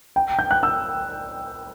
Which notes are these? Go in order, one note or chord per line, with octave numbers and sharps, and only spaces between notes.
G5
G6
F#6
E6